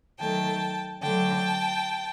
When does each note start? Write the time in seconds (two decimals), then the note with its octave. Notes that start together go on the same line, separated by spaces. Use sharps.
0.19 D#3 F#3 A3 G5 A5
1.02 D3 F#3 A3 G5 A5